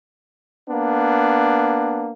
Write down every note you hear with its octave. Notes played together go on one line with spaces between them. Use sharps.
A#3 B3 D4